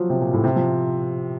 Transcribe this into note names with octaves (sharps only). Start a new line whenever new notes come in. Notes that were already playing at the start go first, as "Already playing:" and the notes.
Already playing: F3 F#3
C3
A#2
A2
C3
F3